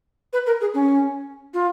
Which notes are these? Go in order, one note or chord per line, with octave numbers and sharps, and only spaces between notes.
B4
A#4
G#4
C#4
F4